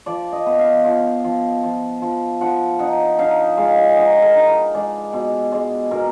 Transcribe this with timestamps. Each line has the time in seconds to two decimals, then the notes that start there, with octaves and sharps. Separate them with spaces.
0.06 F3 D5
0.32 D#5
0.46 B3
0.59 F5
0.84 F3 F5
1.24 F3
1.63 F3
2.02 F3
2.41 F3 F#5
2.79 D#4 F#5
3.19 D#4 F5
3.57 G#3 F5
3.76 G#5
3.96 D#4 F#5
4.22 A#4
4.35 D#4 A#4
4.48 B4
4.74 G#3 D5
5.13 B2
5.52 G#3 D5
5.91 B2 A#4